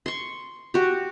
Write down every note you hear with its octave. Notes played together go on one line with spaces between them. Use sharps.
C6 C#6
F#4 G4